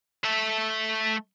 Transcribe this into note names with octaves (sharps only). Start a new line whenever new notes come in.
A3 E5